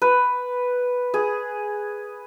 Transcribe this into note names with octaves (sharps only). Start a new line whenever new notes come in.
B4
G#4